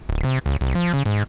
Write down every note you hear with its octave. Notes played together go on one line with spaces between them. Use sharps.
D1
C3
C#2
C2
F3
C#3
G#2